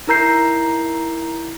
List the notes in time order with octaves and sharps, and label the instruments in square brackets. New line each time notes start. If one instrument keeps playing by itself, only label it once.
[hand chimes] D#4 E4 A#4 A#5 G6 C7